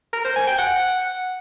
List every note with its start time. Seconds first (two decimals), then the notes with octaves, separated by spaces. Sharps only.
0.13 A#4
0.25 C5
0.36 G#5
0.47 G5
0.59 F#5